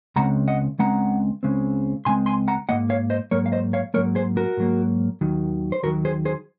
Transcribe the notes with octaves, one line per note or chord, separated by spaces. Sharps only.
C#2 C#3 G#3 C4 F#5 A#5
D#5 F#5
C#2 C#3 G#3 C4 F#5 A#5
C#2 C#3 G#3 C4
C#2 C#3 G#3 C4 G#5 C6
G#5 C6
F#5 A#5
G#2 F#3 A#3 D#5 F#5
C#5 F5
C5 D#5
G#2 F#3 A#3 A#4 C#5
F5
C5 D#5
C#5 F5
G#2 F#3 A#3 A#4 C#5
G#4 C5
F#4 A#4
G#2 F#3 A#3
D#2 D#3 F#3
C5
D#2 D#3 F#3 F#4 A#4
G#4 C5
G#4 C5